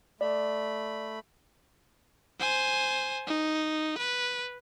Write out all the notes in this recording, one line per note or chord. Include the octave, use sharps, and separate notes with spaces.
A3 D5 B5
C5 G#5
D#4
B4